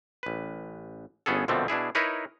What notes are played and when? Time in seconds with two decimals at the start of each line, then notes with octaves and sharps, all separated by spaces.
0.23 A1 B4
1.26 G1 B3 C#4 G#4 A4
1.48 A#1 B2 D3 F3 A3 C4
1.68 B2 D4 E4 G#4
1.95 D#4 E4 A#4 B4 C#5